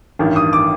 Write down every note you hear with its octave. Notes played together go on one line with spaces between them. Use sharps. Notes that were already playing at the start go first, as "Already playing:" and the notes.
A1 G2 D#3
D#6
D6